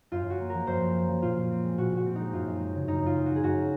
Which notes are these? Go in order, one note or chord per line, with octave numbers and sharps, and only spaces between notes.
F#2 F4
F#2 F#4
A#3
F3 A#4
F#2 C5
F#2
A#3
F3
A#2 F4
A#2
C4
G#3
A#2 F#4
A#2 F#4
C4
G#3 D#4
F#2 F4
F#2
G#3
C#3
F#2 D#4
F#2 F4
G#3
C#3 F#4
G#4
F#2 F#4